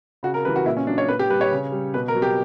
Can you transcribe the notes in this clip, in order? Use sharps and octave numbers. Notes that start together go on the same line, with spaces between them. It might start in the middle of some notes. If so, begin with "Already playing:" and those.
C#3 F#4
A#4
E3 G3 B4
F#4
A#2 E4
C#4
F#3 D4
C#5
A#2 B4
G4
G3 B4
C#5
C#3
G3
B2 B4
A#4
F#3
G4